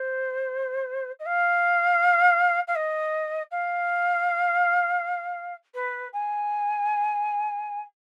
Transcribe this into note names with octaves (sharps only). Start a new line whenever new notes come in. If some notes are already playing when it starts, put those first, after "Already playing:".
Already playing: C5
D#5
F5
F5
D#5
F5
B4
G#5